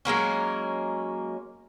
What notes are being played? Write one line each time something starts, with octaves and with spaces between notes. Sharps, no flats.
F#3 G#3 A#3 C#4